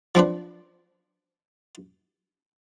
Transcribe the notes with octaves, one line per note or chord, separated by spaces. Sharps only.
F3 C4 D4 B4